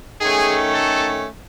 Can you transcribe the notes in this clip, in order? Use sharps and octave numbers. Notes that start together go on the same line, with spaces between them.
D#3 A3 C#4 G#4
A4